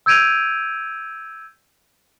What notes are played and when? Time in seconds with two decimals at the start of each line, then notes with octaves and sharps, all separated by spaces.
0.06 E6 G6 G#6 D7 D#7 F7